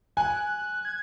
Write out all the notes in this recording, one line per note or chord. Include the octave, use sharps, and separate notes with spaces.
G#5 F#6
G#6